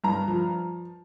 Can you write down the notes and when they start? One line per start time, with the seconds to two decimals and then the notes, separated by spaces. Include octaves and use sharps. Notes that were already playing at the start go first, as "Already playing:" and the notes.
0.04 G2 A#5
0.28 F3